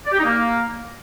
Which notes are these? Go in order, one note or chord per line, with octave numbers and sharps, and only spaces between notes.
D5
G4
D#4
A#3